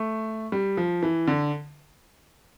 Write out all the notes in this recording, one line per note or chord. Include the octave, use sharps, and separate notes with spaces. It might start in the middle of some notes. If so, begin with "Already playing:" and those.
Already playing: A3
G3
F3
E3
D3